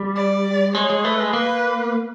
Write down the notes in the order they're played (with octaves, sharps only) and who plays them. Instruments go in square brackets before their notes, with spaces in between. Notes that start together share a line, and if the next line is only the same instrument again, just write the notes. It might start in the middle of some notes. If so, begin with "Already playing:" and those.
Already playing: [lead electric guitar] G3
[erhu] D5
[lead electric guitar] G#3 [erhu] C#5
[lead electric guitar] G#3
[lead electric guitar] A3 [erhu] B4
[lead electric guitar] G#3
[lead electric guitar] A#3 [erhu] B4